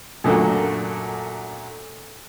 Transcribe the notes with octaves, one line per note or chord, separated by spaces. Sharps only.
F#2 A#2 D3 A3 F#4